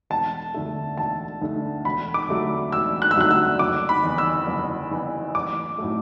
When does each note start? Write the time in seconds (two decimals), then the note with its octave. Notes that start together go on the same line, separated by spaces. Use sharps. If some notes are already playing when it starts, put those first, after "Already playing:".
0.10 E1 A5
0.54 D2 D3 A3
0.98 E1 A5
1.42 D2 D3 A3
1.85 E1 B5
2.14 D6
2.29 D2 D3 F#3 A3
2.72 E1 E6
3.02 F#6
3.11 E6
3.16 D2 D3 F#3 A3 F#6
3.31 E6
3.59 F#1 D6
3.89 B5
4.04 E2 E3
4.18 E6
4.47 F#1
4.91 E2 E3
5.35 A1 D6
5.79 A2 F#3 A3